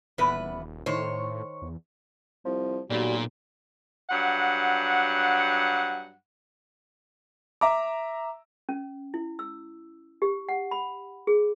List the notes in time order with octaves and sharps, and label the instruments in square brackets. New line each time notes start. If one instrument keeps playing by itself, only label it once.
[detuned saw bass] D#1 [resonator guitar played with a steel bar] E2 B3 B4
[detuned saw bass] A2 [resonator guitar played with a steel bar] D#3 C5 C#5
[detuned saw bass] E2
[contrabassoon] C2 [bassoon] F3
[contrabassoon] B1 [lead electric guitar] A#2 [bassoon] G3 [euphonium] F#4
[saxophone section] G2 F#3 F#5
[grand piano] E5 A#5 D6
[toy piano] C#4
E4
E6
G4
F#5
B5
G#4